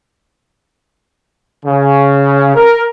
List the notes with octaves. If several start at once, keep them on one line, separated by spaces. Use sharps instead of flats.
C#3
A#4